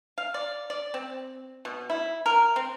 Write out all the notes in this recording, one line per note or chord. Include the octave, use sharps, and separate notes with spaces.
F5
D5
D5
C4
B2
E4
A#4
C4